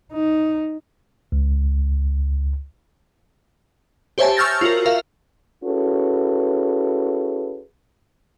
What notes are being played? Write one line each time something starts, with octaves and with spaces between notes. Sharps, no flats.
D#4
C#2
G4 C5 C#5 E5 G#5 A5
C#6 E6 F6 G6 A6 A#6
F4 F#4 A#4
A#4 E5 F5
C#4 E4 F#4 G#4 A4 B4